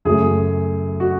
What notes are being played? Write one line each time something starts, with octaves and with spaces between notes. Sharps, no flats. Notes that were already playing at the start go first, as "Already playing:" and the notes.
F#2 C#3 F#3 A3 G#4
F#4